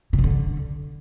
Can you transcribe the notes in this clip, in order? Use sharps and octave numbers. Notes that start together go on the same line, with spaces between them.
B2
C3
D3